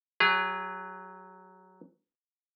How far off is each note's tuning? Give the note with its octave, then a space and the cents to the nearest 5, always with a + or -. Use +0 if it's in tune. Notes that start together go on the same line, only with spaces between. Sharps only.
F#3 +5 G#4 -35